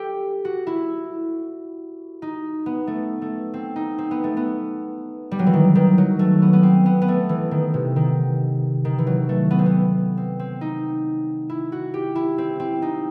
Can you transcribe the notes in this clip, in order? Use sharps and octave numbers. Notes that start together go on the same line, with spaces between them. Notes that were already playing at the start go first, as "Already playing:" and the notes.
Already playing: G4 A4
F#4
E4
D#4
B3
A3
A3
C4
D#4
C4
B3
A3
B3
G3
F#3
E3
D#3
D#3
F#3
A3
B3
B3
C4
B3
B3
A3
E3
D#3
C3
D#3
D#3
E3
F#3
A3
B3
C4
B3
C4
C4
D#4
E4
F#4
G4
E4
C4
C4
D#4